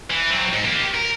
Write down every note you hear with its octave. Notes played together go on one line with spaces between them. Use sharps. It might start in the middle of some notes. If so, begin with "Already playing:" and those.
E3
F#3 C4
G#2
A#3 G4
A#4